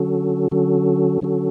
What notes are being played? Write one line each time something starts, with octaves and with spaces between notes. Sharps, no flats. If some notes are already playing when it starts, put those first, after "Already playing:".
Already playing: D3 F#3 C#4 F#4 A4
D3 F#3 C#4 F#4 A4
D3 F#3 C#4 F#4 A4